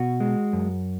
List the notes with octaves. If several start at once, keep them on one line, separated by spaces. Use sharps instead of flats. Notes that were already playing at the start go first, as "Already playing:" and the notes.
Already playing: B2 F#4
G#3
F#2